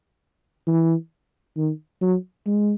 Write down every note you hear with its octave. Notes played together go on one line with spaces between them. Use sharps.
E3
D#3
F#3
G#3